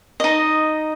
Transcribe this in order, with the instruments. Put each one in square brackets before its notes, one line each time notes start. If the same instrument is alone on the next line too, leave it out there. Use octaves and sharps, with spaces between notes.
[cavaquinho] D#4 D#5